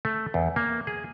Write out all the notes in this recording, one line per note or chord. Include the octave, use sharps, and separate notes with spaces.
A3
E2
A#3
G#4